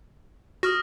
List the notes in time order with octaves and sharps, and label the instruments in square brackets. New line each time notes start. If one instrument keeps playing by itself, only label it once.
[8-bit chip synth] F#4 [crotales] D#6 F6 A#6